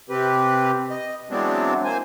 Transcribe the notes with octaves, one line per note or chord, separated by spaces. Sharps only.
C3 C4 G4 B4
D#5
E3 F#3 G#3 B3 C4 D4
A#3 C5 G#5